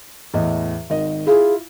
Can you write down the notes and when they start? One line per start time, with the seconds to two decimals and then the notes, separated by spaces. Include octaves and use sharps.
0.34 E2 A2 D#5
0.90 G#1 D#3 D#5
1.27 E4 F4 G#4